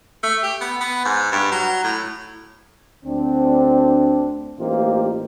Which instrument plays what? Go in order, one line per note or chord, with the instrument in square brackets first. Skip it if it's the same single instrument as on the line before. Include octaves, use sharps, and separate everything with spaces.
[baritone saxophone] A3
G4
B3
B3
G#2
G2
F#3
A2
[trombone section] D2 C4 D4
A1 A#3 D#4 F4 G4 C5